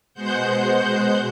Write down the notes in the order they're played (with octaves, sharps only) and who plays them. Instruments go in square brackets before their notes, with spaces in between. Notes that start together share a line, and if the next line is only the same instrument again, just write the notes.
[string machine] B2 G#3 C5 F#5 G6